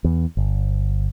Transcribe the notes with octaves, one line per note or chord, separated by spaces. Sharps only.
E2
G1